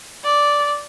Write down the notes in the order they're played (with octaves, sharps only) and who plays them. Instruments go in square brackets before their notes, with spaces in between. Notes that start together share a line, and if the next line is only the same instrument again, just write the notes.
[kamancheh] D5